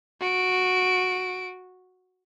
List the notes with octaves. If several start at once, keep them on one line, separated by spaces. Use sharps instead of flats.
F#4 D7